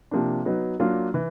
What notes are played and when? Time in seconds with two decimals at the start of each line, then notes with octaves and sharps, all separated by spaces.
0.11 C3 F3 A#3 D4
0.45 F#3 B3 D#4
0.80 F#3 A#3 D4 F4
1.14 E3